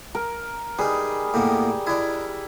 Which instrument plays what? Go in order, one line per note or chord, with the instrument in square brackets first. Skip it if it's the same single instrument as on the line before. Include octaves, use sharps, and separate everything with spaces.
[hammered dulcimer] A#4
[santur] G3 [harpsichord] D#4 B4 [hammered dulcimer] G#4
[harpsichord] A2 A#3 B3 [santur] G4
[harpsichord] D4 D#5 [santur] E4